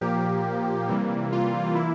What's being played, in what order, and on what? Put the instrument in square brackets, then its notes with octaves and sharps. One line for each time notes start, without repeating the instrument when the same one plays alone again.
[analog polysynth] A#2 F3 A#3 G4
C3 E3 G3 A#3
F4
E3 A#3 E4